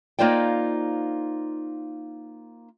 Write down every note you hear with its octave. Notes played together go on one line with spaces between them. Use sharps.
A#3 D#4 F4 C5 D5 G5